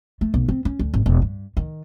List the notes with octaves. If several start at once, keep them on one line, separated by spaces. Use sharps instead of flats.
A3
B1
C4
C#4
D2
G#1
E1
G2
D#3